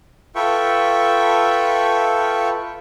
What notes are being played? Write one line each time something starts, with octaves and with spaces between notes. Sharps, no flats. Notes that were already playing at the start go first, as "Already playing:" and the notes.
F4 A4 B4 E5 G5 C#6